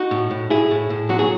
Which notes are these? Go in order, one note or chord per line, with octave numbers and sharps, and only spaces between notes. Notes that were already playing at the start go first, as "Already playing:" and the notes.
Already playing: D#4 F#4
A2
A2
A2 E4 G#4
A2
A2
F#3 F#4
G#4